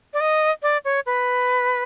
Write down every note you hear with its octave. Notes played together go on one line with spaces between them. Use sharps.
D5
D#5
D5
C#5
B4